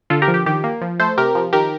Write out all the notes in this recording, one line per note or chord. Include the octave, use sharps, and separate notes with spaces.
D3 F4 A4
G4 A#4
F3
G4
D#3 G4
A#3
F3
A3 A4 C5
C3 G4 A#4
F3
D#3 G4 A#4